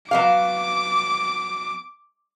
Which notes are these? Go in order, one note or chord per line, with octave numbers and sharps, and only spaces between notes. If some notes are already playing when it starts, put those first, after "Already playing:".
F#3 B3 F5 D6